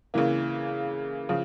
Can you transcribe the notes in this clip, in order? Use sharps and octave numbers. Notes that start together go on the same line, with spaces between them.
C#3 E3 A#3
C#3 F3